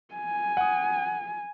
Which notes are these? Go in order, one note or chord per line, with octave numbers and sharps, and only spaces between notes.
G#5
F#5 D#6